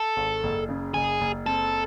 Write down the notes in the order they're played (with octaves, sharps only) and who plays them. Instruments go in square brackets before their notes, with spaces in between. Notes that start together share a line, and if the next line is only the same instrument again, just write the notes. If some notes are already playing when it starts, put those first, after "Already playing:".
Already playing: [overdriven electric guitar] A4
[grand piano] G#1
F#1
C#3
[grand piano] F#1 [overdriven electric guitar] G#4
[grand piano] F#1
[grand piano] C4 [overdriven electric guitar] A4